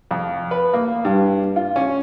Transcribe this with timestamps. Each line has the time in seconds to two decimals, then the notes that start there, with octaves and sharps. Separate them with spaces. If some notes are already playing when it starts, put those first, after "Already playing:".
0.11 F2
0.51 B4
0.73 A#3
1.05 G2
1.56 F4
1.76 C#4